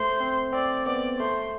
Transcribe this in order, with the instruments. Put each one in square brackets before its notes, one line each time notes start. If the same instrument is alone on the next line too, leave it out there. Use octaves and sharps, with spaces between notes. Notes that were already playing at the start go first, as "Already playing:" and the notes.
Already playing: [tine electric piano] A3 [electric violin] C5
[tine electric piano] C4
[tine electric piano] C4 [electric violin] D5
[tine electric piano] B3 [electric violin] D5
[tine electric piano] A3 [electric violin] C5